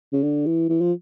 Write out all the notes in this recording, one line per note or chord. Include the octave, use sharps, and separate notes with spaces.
C#3
D3
E3
E3
F3